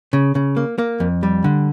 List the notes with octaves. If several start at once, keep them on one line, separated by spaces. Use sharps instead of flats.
C#3
C#3
A#3
A#3
F2
G3
D3